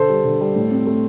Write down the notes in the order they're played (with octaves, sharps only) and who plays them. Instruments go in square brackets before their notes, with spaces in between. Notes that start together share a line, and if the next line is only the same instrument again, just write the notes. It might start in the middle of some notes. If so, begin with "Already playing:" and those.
Already playing: [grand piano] D3 A4 C5
G3
D3
G3
A2
C4
A3